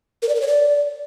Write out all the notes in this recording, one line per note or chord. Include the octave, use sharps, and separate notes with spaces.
A#4
D5
A#4
C#5
D5